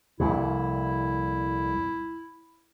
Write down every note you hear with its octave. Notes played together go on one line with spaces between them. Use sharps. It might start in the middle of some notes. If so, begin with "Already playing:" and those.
C2 F2 A#2 E4